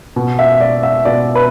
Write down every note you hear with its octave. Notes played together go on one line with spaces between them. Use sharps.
B2
E5
D5
E5
B2 D5
B4